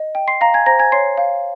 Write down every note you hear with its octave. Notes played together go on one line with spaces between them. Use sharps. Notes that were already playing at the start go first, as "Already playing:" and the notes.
Already playing: D#5
G5
C6 C7
F5 A#5 A#6
G#5 G#6
C5 A#5 A#6
G#5 G#6
C#5 C6 C7
F5